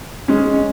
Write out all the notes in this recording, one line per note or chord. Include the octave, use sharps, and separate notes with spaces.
G#3 C#4